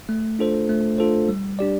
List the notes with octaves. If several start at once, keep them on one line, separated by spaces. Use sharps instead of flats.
A3
D4 F4 A4 C5
A3
D4 F4 A4 C5
G3
D4 G4 D5